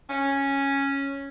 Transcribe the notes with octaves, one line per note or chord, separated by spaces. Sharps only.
C#4